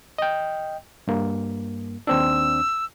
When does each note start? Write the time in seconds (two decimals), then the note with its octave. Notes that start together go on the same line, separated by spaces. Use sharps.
0.18 D#5 G5
1.08 G2 A#3
2.07 D#2 C4 D4 E6